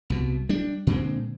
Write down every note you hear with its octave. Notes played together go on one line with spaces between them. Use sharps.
C2 B2
G3 D4
A#2 D3 G#3 C4